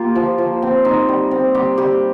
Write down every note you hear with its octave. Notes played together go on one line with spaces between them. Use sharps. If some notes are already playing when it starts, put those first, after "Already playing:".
Already playing: A#3 F4 G4
F3
F3
C4
D#4
G3
C4
G3 G4
G3 G4